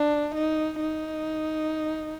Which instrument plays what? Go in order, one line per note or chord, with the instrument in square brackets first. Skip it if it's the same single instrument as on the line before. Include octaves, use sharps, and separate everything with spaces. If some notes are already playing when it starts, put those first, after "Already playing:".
Already playing: [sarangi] D4
D#4
D#4